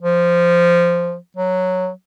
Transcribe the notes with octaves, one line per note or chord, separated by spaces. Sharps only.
F3
F#3